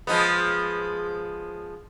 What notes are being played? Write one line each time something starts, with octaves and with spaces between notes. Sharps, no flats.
F3 G#3 B3